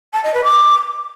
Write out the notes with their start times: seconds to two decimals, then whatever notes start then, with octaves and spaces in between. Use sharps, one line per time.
0.13 A5
0.23 D#5
0.33 B4
0.44 D6